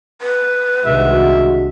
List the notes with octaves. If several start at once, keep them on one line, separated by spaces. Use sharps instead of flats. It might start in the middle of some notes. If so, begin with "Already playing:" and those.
B4
C2 C3 D#3 G#3 D4 F#4 E5